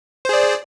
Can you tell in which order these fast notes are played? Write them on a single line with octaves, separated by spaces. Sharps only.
C5 G#4 D5